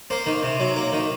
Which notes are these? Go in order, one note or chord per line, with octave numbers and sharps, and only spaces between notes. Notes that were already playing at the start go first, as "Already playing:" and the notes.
A#3 C5
D#3
C3
F#3
A#3
D#3